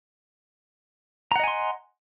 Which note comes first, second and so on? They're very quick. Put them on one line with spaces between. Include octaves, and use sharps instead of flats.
A#5 F#5 D#5 G#5 C6